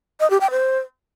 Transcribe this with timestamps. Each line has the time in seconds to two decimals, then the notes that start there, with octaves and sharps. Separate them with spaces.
0.20 D#5
0.30 G4
0.41 G5
0.51 C5